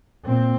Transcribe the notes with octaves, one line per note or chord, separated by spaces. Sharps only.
A#2 C4